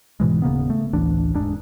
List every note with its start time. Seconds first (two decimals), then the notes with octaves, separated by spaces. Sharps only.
0.20 G#2 B2 E3 G#3
0.42 D#1 C#3 A#3 B3
0.70 A3
0.93 A1 D2 E3 D4
1.33 E1 G#2 D4